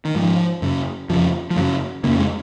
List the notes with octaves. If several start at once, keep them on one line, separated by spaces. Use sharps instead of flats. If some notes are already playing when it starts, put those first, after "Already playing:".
D#3
G#2 F3
F#2 C#3
F2 C#3 F3
F3
F#2 C#3 F#3
F2 C#3 A#3
G#3